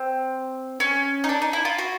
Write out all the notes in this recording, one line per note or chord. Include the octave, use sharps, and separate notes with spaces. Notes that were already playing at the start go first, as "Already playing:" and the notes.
Already playing: C4
C#4
D#4
D4
D#4
E4
F4
F#4